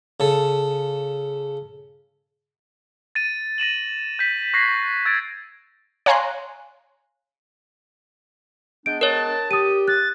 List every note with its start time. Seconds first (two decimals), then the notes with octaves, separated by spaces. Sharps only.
0.20 C#3 A4
3.15 A6 D#7
3.58 A#6 D#7 E7 F#7
4.19 G6 B6
4.54 C#6 F#6 G#6 A#6 C7
5.05 E6 G#6 A6 D7
6.06 C#5 F5 G#5 A#5 C6 F#6
8.86 G#3 B3 D4 G6 D7
9.01 A#4 C#5 A5
9.51 G4 D#6 D#7
9.88 F#6 A6